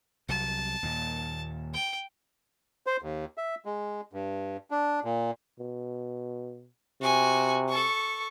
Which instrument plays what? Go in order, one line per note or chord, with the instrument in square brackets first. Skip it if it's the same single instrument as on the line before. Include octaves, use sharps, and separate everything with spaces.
[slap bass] C2 F#3 [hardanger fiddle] A5
[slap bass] D#2 A#2
[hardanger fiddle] G5
[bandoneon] C5
D#2
E5
G#3
G2
D4
A#2
[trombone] B2
[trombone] C3 [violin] F#4 G#5
[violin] A4 C#6